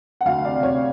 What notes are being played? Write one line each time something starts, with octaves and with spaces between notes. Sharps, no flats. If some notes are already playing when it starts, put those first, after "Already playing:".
F#5
D2 F5
C3 D5
D2 C#5